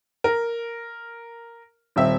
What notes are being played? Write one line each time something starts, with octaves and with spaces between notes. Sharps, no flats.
A#4
D#1 C4 E5